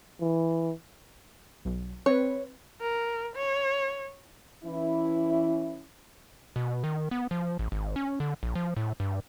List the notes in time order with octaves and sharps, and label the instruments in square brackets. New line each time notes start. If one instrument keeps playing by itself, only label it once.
[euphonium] E3
[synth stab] B1
[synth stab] C4 B4 [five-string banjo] C#5
[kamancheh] A#4
C#5
[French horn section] E3 C#4 E4
[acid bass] B2
D#3
B3
F3
A1
G#1
C#4
D3
A#1
F3
A2
G2